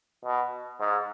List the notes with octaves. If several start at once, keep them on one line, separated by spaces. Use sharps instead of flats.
B2
G#2